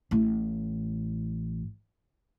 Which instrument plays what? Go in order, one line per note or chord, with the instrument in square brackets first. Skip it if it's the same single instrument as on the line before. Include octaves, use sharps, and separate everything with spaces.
[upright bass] A1 A2